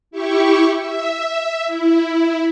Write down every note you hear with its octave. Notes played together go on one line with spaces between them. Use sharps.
E4 G4 C#6
E5
E4